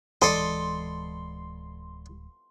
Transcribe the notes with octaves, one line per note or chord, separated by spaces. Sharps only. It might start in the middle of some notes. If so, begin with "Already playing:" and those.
D1 E3 G#3 A4 D5 D#5 C6